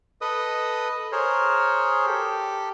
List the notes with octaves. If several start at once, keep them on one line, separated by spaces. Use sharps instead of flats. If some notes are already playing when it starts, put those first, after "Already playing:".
A4 B4 D#5 D#6
G#4 A#4 C5 C#5
G4 A4